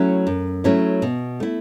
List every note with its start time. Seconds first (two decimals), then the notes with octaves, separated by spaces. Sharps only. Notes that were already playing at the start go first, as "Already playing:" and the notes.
Already playing: F#3 A3 C#4 E4
0.27 F#2
0.64 F#3 A3 C#4 E4
1.02 B2
1.40 A3 E4